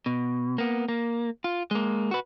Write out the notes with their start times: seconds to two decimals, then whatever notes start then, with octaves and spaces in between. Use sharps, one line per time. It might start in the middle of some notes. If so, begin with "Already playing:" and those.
0.06 B2
0.58 A#3 B3
0.88 A#3
1.44 F4
1.71 G#3 A#3
2.11 F#4 B4